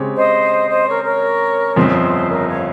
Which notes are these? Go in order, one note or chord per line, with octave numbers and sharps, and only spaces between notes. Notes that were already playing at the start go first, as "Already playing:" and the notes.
Already playing: C#3 G#3 C4 G4 C#5
C5 D#5
C5 D#5
A#4 C#5
A#4 C#5
G1 F2 C#3 F3 C4 C5
A#4 C#5
C#5 F5